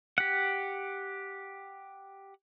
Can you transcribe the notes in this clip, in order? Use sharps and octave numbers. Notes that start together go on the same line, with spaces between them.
G4 F#5